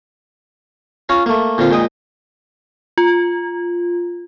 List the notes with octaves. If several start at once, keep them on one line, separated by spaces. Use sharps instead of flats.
C#4 F4 C#5 A#5
A3 A#3
A#2 D3 C4 F4
A#2 G#3 D#4 G5 D#6
F4